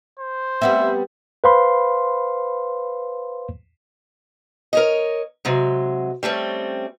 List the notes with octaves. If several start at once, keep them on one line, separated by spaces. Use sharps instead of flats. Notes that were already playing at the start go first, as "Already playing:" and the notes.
C5
G3 B3 C4 E5
B4 C5 F5 B5 C6
A#4 C#5 D#5
C3 F#3 G#3
G3 A3 C4 C#4